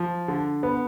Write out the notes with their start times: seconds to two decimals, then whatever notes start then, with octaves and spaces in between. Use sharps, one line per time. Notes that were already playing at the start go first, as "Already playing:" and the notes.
Already playing: F3
0.28 D3
0.63 B3